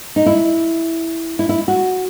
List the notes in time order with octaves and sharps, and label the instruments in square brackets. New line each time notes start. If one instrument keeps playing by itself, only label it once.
[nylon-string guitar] D#4
E4
E4
E4
F#4